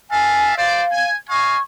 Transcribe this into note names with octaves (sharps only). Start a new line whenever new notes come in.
E5 F5 G#5 A5
C5 D5 F5
G#5
D#5 F5 G#5 C#6